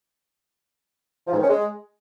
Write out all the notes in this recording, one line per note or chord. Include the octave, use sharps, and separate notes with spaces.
F3
G#2
D#3
C#4
G#3